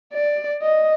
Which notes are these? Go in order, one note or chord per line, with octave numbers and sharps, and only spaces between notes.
D5
D#5